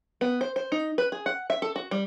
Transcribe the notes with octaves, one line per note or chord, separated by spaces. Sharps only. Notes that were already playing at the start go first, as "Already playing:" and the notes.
B3
C5
C5
D#4
B4
G#4
F#5
E5
A4
F#4
G3